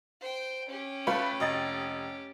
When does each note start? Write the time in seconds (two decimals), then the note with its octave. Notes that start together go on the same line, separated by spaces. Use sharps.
0.21 C5 G5
0.69 C#4 G4
1.07 A3 F4 B4
1.40 F1 D#5 A6